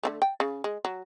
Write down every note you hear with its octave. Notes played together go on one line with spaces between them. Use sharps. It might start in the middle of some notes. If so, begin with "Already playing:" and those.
D3 F3 A3
G5
C#3
G#3
F#3